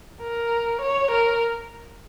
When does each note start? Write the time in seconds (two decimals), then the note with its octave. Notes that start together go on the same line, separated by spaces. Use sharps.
0.22 A#4
0.81 C#5
1.11 A#4